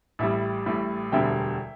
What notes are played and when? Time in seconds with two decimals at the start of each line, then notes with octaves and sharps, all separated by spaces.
0.19 A1 A2 G3 E5
0.66 A1 A2 G3
1.12 E1 D2 D3 G3 E5 G5